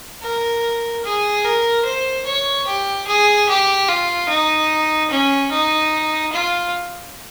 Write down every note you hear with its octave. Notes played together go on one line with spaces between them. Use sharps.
A#4
G#4
A#4
C5
C#5
G4
G#4
G4
F4
D#4
C#4
D#4
F4